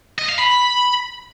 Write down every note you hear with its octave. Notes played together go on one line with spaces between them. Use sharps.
D#5
F5
B5